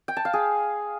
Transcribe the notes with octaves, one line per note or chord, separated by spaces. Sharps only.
G5
A5
F5
G#4